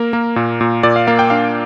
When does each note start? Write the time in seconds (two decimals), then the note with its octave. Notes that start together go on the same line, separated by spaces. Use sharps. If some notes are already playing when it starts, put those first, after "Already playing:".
Already playing: A#3 A#4
0.13 A#3
0.36 A#2
0.61 A#2
0.83 A#2 D5
0.96 F5
1.07 A#3 F5
1.19 G5
1.30 D4 F5